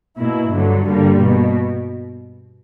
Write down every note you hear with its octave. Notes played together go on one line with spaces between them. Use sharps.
B2 A#3 E4
G2 D3 F#3
G2 D3 G3 A#3
B2